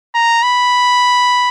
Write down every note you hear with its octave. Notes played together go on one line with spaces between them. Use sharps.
A#5
B5